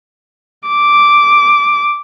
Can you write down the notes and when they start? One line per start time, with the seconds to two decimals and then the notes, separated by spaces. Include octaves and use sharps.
0.68 D6